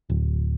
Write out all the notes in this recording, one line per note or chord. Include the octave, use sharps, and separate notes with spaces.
D1